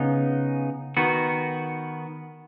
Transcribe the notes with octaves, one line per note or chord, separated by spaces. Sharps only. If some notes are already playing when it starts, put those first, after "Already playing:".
Already playing: C#3 B3 D#4
D#3 B3 F#4